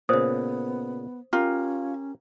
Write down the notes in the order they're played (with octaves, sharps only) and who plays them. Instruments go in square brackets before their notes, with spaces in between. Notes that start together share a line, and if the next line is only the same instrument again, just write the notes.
[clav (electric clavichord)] A#2 C#3 [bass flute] B3 [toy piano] C5 D#6
[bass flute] C#4 [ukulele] F4 [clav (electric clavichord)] G4 A#4